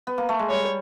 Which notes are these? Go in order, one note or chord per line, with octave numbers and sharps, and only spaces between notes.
B3
A#3
A3
G#3
G3 C#5